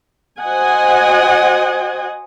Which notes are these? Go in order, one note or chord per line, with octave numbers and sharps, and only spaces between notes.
F#4 C5 D#5 F#5 G#5